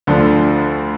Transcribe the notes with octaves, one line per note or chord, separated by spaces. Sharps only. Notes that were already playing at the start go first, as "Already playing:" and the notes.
D2 D3 F3